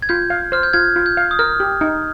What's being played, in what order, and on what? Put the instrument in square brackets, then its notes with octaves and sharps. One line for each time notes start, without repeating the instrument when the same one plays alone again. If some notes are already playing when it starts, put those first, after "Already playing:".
[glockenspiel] G#6
[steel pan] F4 [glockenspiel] G6
[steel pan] F5
[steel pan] C5 [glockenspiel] F6
[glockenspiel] G6
[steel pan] F4 [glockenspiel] F6 G#6
[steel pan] F4
[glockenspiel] G6
[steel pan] F5
[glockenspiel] D#6
[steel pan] A#4 [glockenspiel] F6
[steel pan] G4
D#4